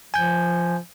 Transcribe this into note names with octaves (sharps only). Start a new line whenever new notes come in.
F3 G#5 G6